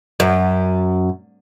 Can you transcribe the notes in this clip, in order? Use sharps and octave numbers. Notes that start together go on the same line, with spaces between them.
F#2